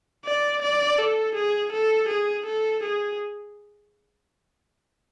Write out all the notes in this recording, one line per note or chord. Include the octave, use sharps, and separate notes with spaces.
D5
D5
A4
G#4
A4
G#4
A4
G#4